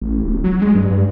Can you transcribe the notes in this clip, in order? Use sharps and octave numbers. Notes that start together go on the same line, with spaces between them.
A1
D1
F#3
G#3
G2
G2